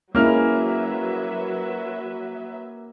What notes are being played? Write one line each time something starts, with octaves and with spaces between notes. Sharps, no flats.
F#3 G#3 A#3 C#4 E4 B4 E5 F6